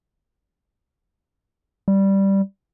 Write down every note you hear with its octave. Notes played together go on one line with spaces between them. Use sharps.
G3